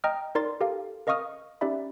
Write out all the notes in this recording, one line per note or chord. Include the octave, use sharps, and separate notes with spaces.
D#5 G5 A#5 D#6 F6
D#4 A#4 D5 C6 A6
G4 A4 A#4 F5
A#4 D#5 F5 C#6 D#6 F6
C#4 D#4 G4 D5 E5 B5